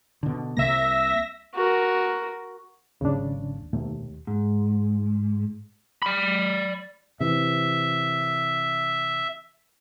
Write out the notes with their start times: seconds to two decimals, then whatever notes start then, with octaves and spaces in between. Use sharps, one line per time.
0.23 B2 D3
0.57 C2 C3 A#3 E5 A#6
1.55 F#4 A#4
3.01 G#1 D#2 C#3 D4
3.73 D#2 B2 A3
4.27 G#2
6.02 D5 B5
7.20 C3 E3 E5